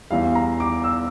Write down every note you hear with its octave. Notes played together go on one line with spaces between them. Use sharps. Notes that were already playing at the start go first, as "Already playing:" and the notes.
E2 E3 G3 F5
A#5
D6
E6